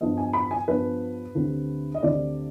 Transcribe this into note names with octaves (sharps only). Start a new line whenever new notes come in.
G2 F3 B3 D#5
G#5
B5
G#5
G2 F3 B3 B4
D2 D3 G3 C4
D#5
D2 D3 G3 C4 D5